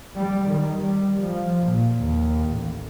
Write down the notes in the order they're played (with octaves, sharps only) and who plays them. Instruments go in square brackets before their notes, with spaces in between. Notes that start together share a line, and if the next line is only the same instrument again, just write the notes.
[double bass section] G3
D#3
G3
F3
A#2
D#2
A1